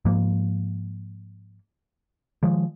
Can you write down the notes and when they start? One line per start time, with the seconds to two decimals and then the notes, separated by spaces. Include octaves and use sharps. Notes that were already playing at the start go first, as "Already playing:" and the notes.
0.05 G#2 F3 A#3
2.43 D#3 F3 G#3